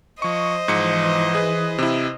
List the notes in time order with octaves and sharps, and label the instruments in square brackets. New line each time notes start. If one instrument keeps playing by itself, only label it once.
[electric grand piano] F3 C#6 [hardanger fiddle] C5 D#5
[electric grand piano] G#2 F3 C#7 [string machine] E3
[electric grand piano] G#4 B4
C3 E4